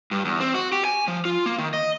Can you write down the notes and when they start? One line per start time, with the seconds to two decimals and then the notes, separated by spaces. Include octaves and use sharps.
0.11 G2
0.25 E2
0.40 C4
0.54 F#4
0.72 G4
0.85 G#5
1.08 F3
1.25 F4
1.46 A#3
1.58 D#3
1.74 D#5